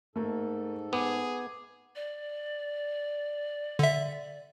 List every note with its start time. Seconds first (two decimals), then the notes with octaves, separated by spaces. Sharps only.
0.16 G#2 A3 A#3 A4
0.93 B3 G#4 D6
1.95 D5
3.79 D3 E5